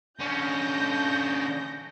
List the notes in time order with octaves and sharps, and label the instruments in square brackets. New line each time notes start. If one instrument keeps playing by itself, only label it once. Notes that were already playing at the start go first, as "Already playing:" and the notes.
[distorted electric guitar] D3 C#4 [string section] G6 A#6